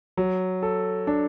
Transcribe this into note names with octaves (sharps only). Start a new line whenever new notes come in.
F#3
A4
D4